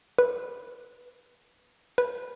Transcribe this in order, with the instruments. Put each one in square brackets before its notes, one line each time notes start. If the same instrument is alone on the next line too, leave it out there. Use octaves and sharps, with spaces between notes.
[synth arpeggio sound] B4
B4